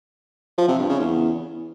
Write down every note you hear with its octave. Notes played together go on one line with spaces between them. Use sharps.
F3
C3
G2
C#3
E2